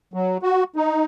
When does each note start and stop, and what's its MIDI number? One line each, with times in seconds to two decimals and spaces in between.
0.14 0.38 54
0.43 0.64 66
0.76 1.05 63